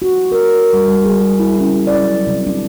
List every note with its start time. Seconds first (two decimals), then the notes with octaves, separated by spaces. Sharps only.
0.02 F#4
0.32 A#4
0.73 G3
0.88 G3
1.05 G#4
1.39 E4
1.60 C#4
1.87 D5
2.02 F#3
2.27 C3
2.47 D4